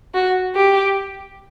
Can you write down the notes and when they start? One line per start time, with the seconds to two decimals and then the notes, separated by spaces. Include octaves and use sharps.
0.14 F#4
0.55 G4